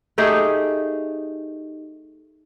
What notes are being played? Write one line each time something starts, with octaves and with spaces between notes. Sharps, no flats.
A3 D#4 G4 G#4